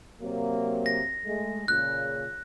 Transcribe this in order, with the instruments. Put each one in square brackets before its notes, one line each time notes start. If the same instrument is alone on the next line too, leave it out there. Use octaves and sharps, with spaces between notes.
[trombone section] C3 F#3 A#3
[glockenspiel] A#6
[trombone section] G#3 A3
[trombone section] A#2 C#3 [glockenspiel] F#6